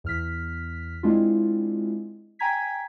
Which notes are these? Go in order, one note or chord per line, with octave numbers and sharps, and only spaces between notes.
E2 F6 B6
G#3 C4 D4 E4 F4
G5 G#5 A#5 G#6 B6